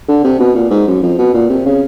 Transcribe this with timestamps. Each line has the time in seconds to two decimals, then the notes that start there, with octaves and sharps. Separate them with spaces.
0.08 D3
0.24 C3
0.39 B2
0.55 A#2
0.70 G#2
0.87 F#2
1.02 F2
1.18 B2
1.34 A#2
1.49 C3
1.66 C#3